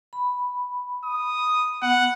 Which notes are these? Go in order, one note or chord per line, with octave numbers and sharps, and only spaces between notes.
B5
D#6
B3 F#5